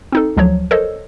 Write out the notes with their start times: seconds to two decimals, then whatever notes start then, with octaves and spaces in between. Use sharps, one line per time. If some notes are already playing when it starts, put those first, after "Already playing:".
0.12 C4 D#4 A4
0.37 D2 F3 F#3 C#5
0.71 A4 A#4 C5 C#5 D#5